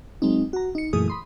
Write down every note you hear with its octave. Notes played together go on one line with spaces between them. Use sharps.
F#3 G#3 C4 D#4
F#4 A#5
D#4 C#7
F#2 A#2 E3 A3 G#4 D#6
B5 C6 D#6